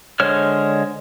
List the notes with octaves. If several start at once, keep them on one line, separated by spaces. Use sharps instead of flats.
D3 G#3 C5 C#5 F6